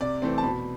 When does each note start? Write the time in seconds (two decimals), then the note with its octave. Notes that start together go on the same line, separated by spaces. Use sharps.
0.01 C3 D5
0.22 E3 A3 C4
0.38 A5
0.43 B2 B5